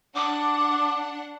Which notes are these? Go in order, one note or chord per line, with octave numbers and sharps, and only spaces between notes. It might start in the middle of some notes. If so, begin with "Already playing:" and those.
D4 F#5 D6